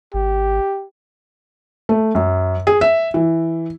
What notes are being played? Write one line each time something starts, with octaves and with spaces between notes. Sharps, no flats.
G#1 G4
A3
F#2
G#4
E5
E3